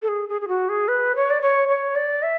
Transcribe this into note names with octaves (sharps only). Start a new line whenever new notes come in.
A4
G#4
G#4
G#4
F#4
G#4
B4
C#5
D5
C#5
C#5
D5
E5